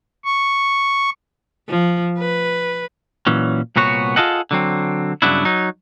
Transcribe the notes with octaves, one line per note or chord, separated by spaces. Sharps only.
C#6
F3
B4
A#2 E3 F#3 C#4
C2 A#2 B3 F#4 C#5
F4 F#4 G#4 A4 D#5 F#5
D3 F#3 C4
G2 C#3 F#3 B3 D4 E4
F#3 D#4